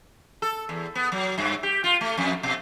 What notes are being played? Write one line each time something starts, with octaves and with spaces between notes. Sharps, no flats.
A4
E2
B3
F#3
G2
G4
F4
A3
F2
B2